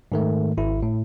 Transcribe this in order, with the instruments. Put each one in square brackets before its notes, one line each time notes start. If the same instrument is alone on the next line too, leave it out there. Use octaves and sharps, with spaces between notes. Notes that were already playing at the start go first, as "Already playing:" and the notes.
[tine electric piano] G#2 D#3 A3
G#1 E4
A2